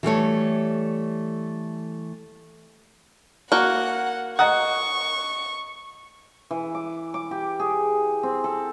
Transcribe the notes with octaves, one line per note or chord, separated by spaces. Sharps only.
E3 G3 A3 C#5
A#3 F#4 F#5
D#5 F#5 A#5 C#6 D#6
E3
D6
D6
G4
G#4
C4
A4